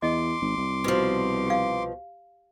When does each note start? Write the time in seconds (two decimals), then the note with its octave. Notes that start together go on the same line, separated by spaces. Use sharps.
0.02 E2 D#5 C6 D6
0.41 G#1
0.57 C2
0.84 B2 F3
1.46 G4 F5